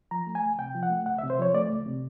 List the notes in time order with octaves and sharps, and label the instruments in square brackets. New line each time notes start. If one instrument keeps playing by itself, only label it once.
[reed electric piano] F3 A#5
A3
G#5
C#2
C3 G5
F3
F#5
A3
C#2 F#5
E5
C3
C5
F3 C#5
A3 D5
C#2
C3